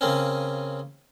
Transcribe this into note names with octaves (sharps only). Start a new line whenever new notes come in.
C#3 A#3 C4 C#4